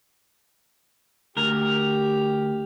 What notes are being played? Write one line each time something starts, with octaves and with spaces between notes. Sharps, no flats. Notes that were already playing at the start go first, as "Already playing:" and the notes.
D2 G4 A#4